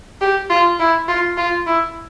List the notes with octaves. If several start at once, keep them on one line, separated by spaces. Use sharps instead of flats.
G4
F4
E4
F4
F4
E4